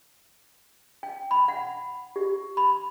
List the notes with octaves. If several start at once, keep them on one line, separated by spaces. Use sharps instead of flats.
G5
B5
F#5
G4
B5